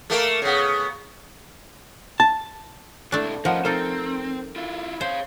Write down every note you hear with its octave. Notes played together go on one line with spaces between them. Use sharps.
A3 A#3 A#4
C#3 B3
A5
B1 A3 D4 E4
F3 C#4 D#4 A#4 F#5
C4 D#4 A4 A#4
E4 F4
C5 C#5 F5